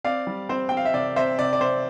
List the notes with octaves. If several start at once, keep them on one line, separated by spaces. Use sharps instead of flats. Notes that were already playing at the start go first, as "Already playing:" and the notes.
C4 D5 F5
G3
C4 C5
C4 G5
F5
E5
C3 D5
C3 C5 E5
C3 D5
D5
C3 C5